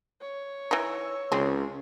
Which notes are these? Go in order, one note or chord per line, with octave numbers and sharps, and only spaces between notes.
C#5
E3 D#4 E6
C#2 G#3 C4 C#4